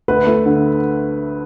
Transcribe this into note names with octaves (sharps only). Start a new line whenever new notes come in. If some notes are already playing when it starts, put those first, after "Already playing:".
D2 B4
A3
D3